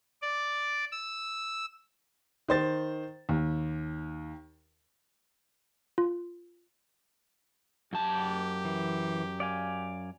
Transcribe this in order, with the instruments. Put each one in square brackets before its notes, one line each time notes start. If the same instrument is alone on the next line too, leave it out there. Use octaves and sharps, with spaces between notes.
[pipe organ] D5
E6
[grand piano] D#3 C5 A6
D#2
[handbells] F4
[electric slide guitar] F#2 A5 [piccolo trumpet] G4
[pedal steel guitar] E3
D5 F5 G#5